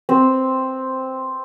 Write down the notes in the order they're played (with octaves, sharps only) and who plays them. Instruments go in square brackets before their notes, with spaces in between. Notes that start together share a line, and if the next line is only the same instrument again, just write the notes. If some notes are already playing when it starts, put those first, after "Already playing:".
[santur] C4